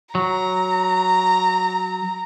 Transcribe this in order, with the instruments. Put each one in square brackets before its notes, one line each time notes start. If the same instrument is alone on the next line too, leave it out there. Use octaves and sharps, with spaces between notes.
[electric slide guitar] F#3 [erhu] A#5